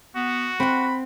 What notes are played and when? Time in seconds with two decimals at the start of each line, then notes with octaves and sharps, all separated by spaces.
0.16 B3 F#4
0.60 C4 F#5 B5